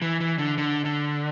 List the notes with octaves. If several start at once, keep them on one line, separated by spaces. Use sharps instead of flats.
E3
E3
D3
D3
D3